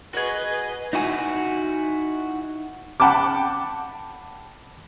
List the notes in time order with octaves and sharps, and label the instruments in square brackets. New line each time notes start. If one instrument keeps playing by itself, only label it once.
[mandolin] F#4 G#4 [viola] B4 D#5
[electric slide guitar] D#4 E4 F#4 G#5
[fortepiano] F#5 G5 A5 B5 D6